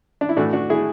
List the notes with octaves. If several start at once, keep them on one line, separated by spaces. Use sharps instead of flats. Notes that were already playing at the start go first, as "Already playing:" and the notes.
D4
E4
A2 E3 A3 D4 F#4
D4 F#4
E4 G#4